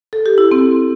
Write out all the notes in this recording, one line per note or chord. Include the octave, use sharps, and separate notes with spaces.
A4
G4
E4
C4